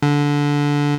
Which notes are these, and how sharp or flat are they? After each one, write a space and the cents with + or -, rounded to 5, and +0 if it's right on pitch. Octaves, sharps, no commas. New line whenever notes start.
D3 -15